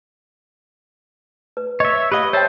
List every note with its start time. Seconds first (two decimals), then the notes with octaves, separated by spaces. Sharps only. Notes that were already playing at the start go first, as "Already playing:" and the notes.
1.57 B4
1.80 C#5 D#5 E5
2.12 G4 B4 D#5 F5
2.33 C5 C#5 E5 G5 A5